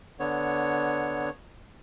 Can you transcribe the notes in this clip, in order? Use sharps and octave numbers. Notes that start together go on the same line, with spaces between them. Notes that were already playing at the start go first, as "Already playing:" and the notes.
D3 B3 C#5